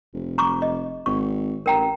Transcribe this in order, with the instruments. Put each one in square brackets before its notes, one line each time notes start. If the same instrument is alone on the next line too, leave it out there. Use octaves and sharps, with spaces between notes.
[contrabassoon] F1
[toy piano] A#5 C#6 D6
D#5
[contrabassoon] G#1 [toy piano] C#6
[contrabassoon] A1 [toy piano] A#4 G5 A#5